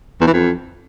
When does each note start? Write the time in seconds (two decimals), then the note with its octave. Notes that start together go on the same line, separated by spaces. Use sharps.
0.21 E2
0.27 E3
0.33 F2